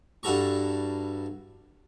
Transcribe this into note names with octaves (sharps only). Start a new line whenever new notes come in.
G2 E4 F#4 A4 A#5 C#6